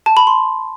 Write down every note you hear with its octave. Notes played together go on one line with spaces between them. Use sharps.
A5
B5
C6